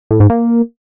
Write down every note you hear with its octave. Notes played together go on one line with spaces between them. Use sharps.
A2
G#2
A#3